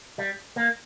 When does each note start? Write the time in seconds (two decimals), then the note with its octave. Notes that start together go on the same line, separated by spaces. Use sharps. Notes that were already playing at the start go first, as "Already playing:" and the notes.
0.18 G3
0.56 A#3